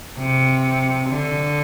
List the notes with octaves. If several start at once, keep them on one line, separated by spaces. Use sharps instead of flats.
C3
D3